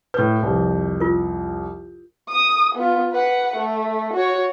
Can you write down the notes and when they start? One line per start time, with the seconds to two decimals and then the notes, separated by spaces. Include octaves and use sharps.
0.14 A2 B4 G6
0.43 C2 F2
1.00 F4 A#4
2.29 D#6
2.75 B3 F4
3.12 B4 F#5
3.56 A3
4.13 F#4 C#5